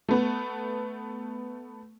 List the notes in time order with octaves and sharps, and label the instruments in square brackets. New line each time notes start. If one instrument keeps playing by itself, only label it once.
[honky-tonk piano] A3 B3